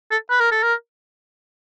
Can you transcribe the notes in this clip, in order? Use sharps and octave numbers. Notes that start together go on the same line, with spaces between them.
A4
B4
A#4
A4
A#4